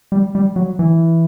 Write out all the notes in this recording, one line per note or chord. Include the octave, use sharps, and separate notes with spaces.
G3
G3
F#3
E3